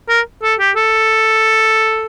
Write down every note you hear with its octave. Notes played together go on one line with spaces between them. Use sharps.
A#4
A4
G4
A4